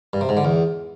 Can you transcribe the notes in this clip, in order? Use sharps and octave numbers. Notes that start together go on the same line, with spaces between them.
G2
C3
G#2
D3
E2